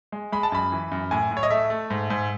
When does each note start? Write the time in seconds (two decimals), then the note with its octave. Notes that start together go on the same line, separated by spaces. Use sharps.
0.12 G#3
0.32 G#3 B5
0.43 A5
0.52 F#2 B5
0.72 E3
0.92 F#2
1.11 A2 G#5
1.31 A2
1.37 C#5
1.43 D#5
1.50 A3 E5
1.70 A3
1.90 G#2
2.10 G#2